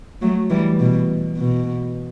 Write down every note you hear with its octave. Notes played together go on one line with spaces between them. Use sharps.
F#3 A3
E3 G3
B2
B2